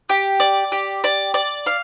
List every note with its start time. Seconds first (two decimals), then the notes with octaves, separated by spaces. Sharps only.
0.09 G4
0.40 D5
0.72 G4
1.04 D5
1.34 D5
1.66 F5